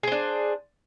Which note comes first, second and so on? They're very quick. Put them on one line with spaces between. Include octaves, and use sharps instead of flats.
G#4 C5 D4